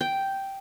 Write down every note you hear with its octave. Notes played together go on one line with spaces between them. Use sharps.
G5